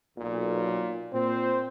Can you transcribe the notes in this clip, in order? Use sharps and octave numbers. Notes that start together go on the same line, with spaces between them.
B1 A#2
A#2 C4 C5